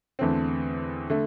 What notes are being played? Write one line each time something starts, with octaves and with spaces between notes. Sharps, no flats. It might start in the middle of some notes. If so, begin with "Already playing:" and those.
E2 D3 A3 C4
D3 A3